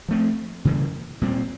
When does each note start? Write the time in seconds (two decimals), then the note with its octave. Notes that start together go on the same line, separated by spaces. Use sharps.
0.09 F3 A3 C4
0.65 C#3 E3 G3 A#3
1.21 A#2 G3 C4